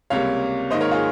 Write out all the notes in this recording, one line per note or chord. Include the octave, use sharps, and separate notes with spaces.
C#2 C3 G3 A#3 C#5 F5
G#2 D#3 A#3 C5 D#5
A#4 C#5
F4 G#4